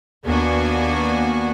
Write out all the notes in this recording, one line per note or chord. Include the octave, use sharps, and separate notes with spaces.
D#2 A#3 B3 D4 F#4 G#5